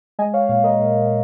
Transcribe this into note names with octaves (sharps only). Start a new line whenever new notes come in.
G#3 D#5 G#5
C#5 F5
A#2 C#5 F5
A#4 D#5
A#2